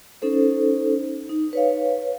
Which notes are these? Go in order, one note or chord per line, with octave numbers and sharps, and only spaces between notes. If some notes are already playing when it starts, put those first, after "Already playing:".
C#4 D#4 A4 C5
D#4
B4 C#5 F5